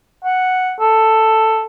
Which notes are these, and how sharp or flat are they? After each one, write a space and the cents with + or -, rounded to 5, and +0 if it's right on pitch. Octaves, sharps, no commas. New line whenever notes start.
F#5 +0
A4 +5